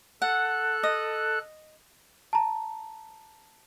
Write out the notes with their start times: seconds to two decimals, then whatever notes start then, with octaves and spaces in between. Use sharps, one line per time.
0.22 A4 F#5 F#6
0.83 D#5
2.33 A5 A#5